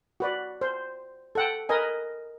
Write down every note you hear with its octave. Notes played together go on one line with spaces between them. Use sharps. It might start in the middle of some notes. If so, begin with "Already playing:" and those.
F#4 B4 D5
C5
A4 F#5 G5
A#4 B4 D#5 G#5